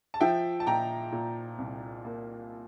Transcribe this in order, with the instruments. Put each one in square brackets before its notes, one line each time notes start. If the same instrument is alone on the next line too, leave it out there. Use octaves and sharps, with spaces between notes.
[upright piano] A5
F3 E5 G5
A5
A#2 G5 A#5
A#2
C2
A#3